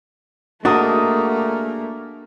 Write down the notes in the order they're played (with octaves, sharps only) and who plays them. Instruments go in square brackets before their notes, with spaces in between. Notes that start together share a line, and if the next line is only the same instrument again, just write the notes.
[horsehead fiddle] A3 [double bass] A#3 [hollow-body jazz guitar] D4 F#4 [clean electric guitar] G#4 A#4 D#5